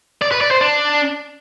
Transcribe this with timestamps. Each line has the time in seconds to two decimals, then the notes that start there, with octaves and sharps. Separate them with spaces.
0.22 D5
0.31 B4
0.41 D5
0.51 C5
0.61 D4